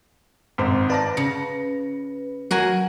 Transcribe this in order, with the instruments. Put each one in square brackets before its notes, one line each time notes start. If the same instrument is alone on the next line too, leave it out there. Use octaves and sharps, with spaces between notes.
[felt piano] G#1 G#2 C4
[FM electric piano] B4 [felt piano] D5 A5 A#6
[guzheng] C#3 [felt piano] A#6 C#7
[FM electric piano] F#3 [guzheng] F#4 A#4 G#5